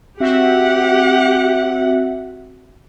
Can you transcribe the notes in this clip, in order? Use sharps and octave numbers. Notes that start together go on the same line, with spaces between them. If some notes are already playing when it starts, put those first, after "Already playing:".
C4 F#4 G4 E5 F#5